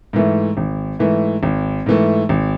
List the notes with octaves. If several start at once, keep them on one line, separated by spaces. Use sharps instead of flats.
G#2 E3 A3
G#1
G#2 E3 A3
G#1
G#2 E3 A3
G#1